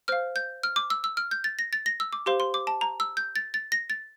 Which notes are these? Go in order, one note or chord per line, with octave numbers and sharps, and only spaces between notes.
C5 F5 F6
G6
F6
D6
E6
E6
F6
G6
A6
A#6
A6
A#6
E6
D6
G4 C5 F5 C6
C6
D6
A5
A#5
E6
G6
A6
A6
A#6
A6